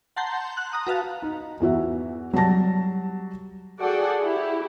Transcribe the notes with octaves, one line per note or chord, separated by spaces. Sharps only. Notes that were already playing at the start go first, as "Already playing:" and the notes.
F#5 A5 A#5 C6 G6
F#6
A#5 D#6 F#6
F#4 B4 F5 A5
D#4
E2 E3 F#4 E5
F#3 G3 A5 A#6
F#4 G#4 A4 D5 F#5 G5
E4 G4